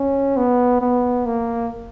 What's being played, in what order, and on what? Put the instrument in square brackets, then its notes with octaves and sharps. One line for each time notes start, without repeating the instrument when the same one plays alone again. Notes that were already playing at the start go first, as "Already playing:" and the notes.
Already playing: [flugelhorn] C#4
B3
B3
A#3